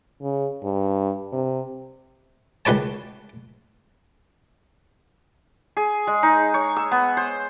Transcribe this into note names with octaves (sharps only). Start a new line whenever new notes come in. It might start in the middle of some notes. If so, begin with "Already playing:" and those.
C#3
G2
C3
C#2 D#3 B4 C#5 A5
G#4
G#3
D#4
C#5
E6
B3
C5